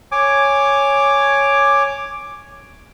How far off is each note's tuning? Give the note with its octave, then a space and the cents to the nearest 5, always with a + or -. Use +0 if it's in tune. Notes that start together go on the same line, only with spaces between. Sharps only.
C#5 +0 G#5 +0 D6 +5